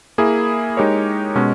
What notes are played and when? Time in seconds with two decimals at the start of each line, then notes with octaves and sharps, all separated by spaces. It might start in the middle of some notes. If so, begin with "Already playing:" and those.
0.18 A#3 E4 G#4
0.77 G#3 D#4 G4 A#4 C#5
1.35 B2 G#3 C#4